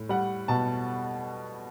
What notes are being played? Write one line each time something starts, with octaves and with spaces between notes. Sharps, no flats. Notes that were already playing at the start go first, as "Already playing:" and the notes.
Already playing: A2
G3 F#5
B2 A5